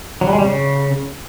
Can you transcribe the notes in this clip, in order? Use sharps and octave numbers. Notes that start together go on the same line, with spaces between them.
F#3
G3
G#3
G3
C#3